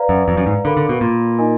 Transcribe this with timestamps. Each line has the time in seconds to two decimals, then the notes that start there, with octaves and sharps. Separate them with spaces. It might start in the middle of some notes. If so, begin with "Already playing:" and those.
Already playing: B4 D5 F5 A#5
0.09 F#2
0.28 F2
0.37 F#2
0.46 G#2
0.65 D3 A#4 F5 B5
0.77 D3
0.89 B2
1.01 A#2
1.39 D#4 A#4 D#5 G#5